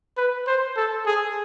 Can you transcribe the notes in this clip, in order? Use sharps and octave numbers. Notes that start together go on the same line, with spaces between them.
B4
C5
A4
G#4